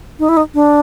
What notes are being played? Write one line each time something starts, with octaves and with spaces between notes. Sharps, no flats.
D#4
E4
D#4
D4